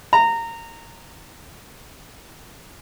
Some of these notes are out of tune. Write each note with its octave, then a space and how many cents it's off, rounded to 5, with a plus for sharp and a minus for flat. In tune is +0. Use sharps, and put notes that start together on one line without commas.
A#5 -20